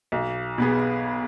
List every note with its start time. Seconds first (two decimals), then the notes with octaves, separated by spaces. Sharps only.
0.12 B1
0.58 B2 B3 G#4